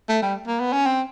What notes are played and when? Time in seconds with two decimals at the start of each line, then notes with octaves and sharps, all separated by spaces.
0.09 A3
0.23 G3
0.47 A#3
0.60 B3
0.73 C#4
0.86 C4